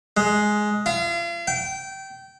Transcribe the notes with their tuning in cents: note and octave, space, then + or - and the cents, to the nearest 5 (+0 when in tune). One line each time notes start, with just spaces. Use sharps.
G#3 +10
F4 -40
G5 -20